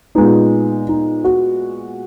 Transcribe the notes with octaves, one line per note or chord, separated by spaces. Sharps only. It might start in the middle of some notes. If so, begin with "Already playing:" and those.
A#2 G#3 B3 D#4
D#4
F#4